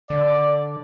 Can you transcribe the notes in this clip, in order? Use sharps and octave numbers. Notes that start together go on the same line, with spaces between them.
D3 D5